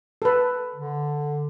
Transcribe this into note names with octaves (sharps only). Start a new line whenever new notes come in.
A4 B4
D3